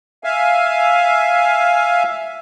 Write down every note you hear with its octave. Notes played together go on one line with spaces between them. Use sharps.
E5 F5 G#5